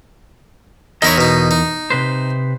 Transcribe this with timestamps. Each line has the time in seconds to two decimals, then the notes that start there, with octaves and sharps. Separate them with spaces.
1.02 E2 D#4 E4 A#4 C#5 D#5
1.18 B2 D#4
1.51 D#4
1.90 C3 B4 C5